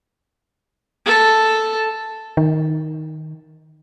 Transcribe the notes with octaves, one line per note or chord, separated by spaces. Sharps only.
A4
D#3